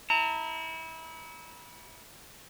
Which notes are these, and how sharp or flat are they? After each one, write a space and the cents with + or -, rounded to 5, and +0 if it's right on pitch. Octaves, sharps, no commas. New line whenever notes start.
E4 -30 A#5 -35